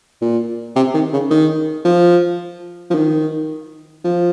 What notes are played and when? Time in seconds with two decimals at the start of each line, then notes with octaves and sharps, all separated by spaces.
0.22 A#2
0.76 C3
0.94 D#3
1.13 C#3
1.30 D#3
1.85 F3
2.90 F3
2.95 D#3
4.05 F3